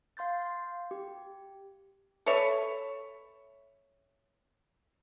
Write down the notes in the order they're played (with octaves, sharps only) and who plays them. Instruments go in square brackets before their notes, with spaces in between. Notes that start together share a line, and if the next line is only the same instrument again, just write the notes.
[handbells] F5 C6 G6 A6
G4
[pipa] A4 B4 C#5 E5